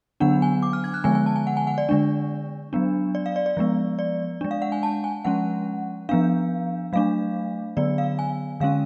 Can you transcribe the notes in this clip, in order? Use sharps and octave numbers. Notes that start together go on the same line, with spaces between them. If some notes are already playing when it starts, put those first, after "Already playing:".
D3 F#3 B3 D4 F#5
G#5
D6
F6
G#6
F#6
D3 F3 G#3 B3 G#5
G#5
A5
G#5
F#5
G#5
F#5
D5
D3 G#3 D4
F#3 B3 D4
D5
F5
D5
D5
F3 G#3 B3
D5
G#3 D4
F5
F#5
G#5
A5
G#5
F3 G#3 C#4 F#5
F3 B3 D4 F5
F#3 A3 D4 F5
D3 F#3 B3 D5
F5
G#5
D3 G#3 C#4 F5